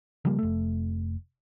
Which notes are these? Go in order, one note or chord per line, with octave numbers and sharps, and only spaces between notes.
C#3 F3 G3 A#3
F1 A3